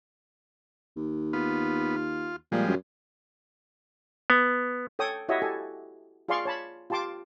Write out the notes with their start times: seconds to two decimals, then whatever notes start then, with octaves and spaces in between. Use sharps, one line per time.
0.97 D#2
1.33 B3 F4
1.96 F4
2.52 A#2 F3 G3 G#3
2.68 F#2
4.30 B3
4.99 A4 C#5 G5 D#6
5.29 E4 F#4 G4 C#5 D#5 E5
5.42 G4 A4 G#5
6.28 F4 G#4 D5 F5 C6 C#6
6.45 C#5 A5 B5
6.90 F4 G4 A5 C6 D6